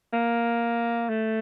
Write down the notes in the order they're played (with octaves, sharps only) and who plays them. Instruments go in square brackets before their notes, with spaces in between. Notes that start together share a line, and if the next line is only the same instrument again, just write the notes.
[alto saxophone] A#3
A3